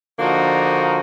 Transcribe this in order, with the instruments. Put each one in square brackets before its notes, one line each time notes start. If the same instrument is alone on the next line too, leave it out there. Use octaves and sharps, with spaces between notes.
[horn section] D3 F3 A#3 D#4 F#4